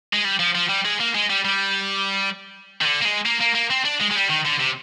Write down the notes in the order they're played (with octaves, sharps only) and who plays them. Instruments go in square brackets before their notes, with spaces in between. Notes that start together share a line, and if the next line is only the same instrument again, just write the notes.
[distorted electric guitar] G#3
G3
F3
F3
G3
G#3
A#3
G#3
G3
G3
D#3
D3
A#3
G#3
A#3
A#3
A#3
C4
D4
G#3
G#3
G3
D#3
D3
C3